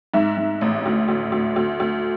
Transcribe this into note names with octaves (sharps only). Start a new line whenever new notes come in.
G#2 E5
G#2
A1
D2
D2
D2
D2
D2